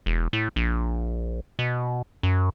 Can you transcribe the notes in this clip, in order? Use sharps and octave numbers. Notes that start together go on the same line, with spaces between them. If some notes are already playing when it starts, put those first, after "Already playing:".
E1
A2
A#1
B2
F#2